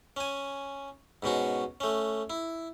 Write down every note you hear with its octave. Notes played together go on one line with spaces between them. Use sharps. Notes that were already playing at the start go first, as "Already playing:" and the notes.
C#4 G#5
G#2 B2 C#4 F#4
A3 C#4
E4